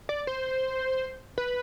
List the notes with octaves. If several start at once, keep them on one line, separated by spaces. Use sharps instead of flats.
D5
C5
B4